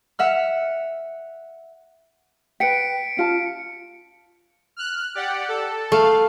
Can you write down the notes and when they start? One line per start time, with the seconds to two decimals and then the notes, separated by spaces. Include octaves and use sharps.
0.19 E5 F#5 F6
2.60 B4 G5 B6 C#7 D7
3.17 C#4 F4 A5
4.76 F6 F#6
5.15 G4 D5 F#5
5.49 A4
5.92 A3 F5